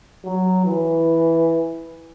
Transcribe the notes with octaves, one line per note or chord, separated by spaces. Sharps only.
F#3
E3